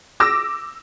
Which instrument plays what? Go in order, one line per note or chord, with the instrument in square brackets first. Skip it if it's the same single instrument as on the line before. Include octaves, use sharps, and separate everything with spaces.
[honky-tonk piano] D6 E6 A#6